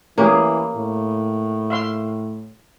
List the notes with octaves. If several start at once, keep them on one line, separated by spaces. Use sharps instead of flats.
E3 A#3 C#4 G4 G#4
A2
E5 F5 C6